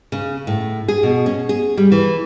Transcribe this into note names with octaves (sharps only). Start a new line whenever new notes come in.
C#3
A2
G#4
B2
C#4
G#4
G3
E3